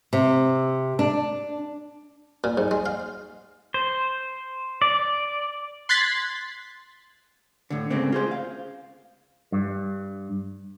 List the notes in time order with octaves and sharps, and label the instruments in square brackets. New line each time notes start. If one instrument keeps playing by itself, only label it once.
[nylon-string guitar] C3
D4
[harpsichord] A#2
G#2
G#3
F5
[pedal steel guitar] C5
D5
[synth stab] C6 F#6 G#6 A6 B6 C7
[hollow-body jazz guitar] A2 D3
G#2 C#3 A3 A#3 C4 D4
F4 G#4 C5
F5
[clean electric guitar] G2